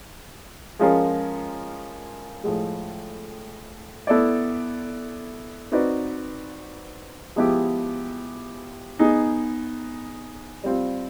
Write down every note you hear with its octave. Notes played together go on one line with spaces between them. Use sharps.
F3 G#3 C#4 F4 A#4
A2 F3 G#3
B3 E4 A4 D5
C4 D#4 F#4 B4 D5
F3 G#3 B3 E4 G4
B3 D#4 G#4
G3 C4 F4